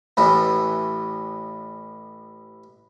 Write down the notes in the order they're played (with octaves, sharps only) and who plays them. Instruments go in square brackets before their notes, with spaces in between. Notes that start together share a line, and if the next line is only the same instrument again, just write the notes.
[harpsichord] A1 A2 E3 [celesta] B5